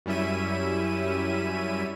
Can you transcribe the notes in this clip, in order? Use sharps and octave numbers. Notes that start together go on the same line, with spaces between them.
F#2 G3 C#4 E4 E5 D#7